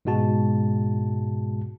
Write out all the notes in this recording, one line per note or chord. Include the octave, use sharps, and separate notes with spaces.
G#2 B2 G#3 F#4 A5